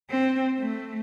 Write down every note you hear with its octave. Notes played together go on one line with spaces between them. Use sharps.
C4
A3